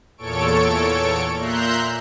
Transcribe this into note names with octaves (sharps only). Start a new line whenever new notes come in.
E2 A#2 A4 C#5 C#6 D7
A#2 E5 A#5 C6 F#6 G6